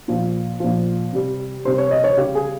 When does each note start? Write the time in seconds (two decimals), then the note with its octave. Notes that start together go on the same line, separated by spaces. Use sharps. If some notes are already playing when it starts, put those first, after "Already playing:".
0.08 A#2 F3
0.60 A#2 F3
1.13 C3 G3
1.65 C3 G3 C5
1.78 C#5
1.91 D#5
2.04 C#5
2.17 C#3 G3 G4
2.35 G#4